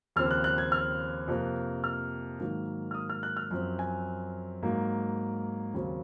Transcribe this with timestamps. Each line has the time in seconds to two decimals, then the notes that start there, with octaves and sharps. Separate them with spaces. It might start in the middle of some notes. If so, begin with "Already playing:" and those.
0.16 D#2 C#3 F3 C4 F6
0.31 F#6
0.44 F#6
0.58 G#6
0.72 F6
1.28 F2 C3 F3 A#3
1.84 F6
2.40 G#2 D#3 F#3 A#3
2.91 F6
2.94 D#6
3.10 F6
3.23 F#6
3.37 F6
3.51 F#2 F3 C4
3.79 G#5
4.63 G#2 F#3 A#3
5.74 D#2 C#3 F#3 C4